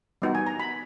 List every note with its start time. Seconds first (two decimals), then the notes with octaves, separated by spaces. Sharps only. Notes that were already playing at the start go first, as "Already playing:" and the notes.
0.22 G3 B3 D#4 F#4
0.35 G#5
0.47 A#5
0.60 B5